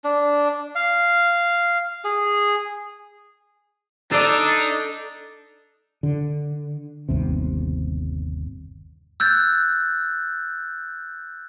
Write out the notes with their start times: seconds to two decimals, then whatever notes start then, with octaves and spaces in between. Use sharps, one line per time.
0.04 D4
0.75 F5
2.04 G#4
4.11 D4 D#4 A4 D5
6.03 D3
7.09 G1 D#2 C3
9.20 E6 F#6 G6 A6